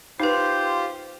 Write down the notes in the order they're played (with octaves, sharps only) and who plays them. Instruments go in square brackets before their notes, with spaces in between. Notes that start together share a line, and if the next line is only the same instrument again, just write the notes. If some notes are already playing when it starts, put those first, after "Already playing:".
[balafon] D#4 B4 [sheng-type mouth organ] F4 G4 C5